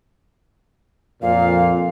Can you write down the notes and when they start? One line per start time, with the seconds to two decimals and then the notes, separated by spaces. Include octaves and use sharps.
1.22 F2 A#2 F5